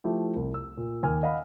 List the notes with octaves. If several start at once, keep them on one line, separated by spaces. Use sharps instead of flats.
F3 A3 E4 G4
C2
E6
A#2
D#2 G#5 F6
D#5 F5 F#5 B5